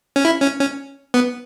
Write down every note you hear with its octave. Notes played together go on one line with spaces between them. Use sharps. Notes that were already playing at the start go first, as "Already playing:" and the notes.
C#4
E4
C#4
C#4
B3